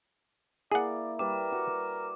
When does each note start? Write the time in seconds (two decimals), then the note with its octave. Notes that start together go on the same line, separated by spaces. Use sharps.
0.72 A#3 E4 G#4 D5 F#5
1.19 G3 A#4 B4 D5 D6
1.52 F#4